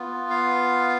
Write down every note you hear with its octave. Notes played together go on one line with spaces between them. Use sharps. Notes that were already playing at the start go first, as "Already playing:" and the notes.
Already playing: B3 F4
F5